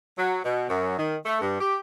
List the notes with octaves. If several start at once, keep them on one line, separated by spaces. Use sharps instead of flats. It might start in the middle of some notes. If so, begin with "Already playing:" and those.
F#3
B2
F#2
D#3
A3
G2
G4